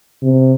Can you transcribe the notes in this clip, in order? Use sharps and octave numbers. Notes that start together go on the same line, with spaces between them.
C3